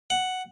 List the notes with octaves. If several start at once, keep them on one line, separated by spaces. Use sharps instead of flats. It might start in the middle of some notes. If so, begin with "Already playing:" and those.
F#5